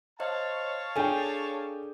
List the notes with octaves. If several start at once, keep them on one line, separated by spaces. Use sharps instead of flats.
C5 C#5 D#5 F5 A5
D4 G#4 A4 G5 G#5